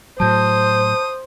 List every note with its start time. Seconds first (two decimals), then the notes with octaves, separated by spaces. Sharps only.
0.20 A2 F#3 C5 A5 D#6 G6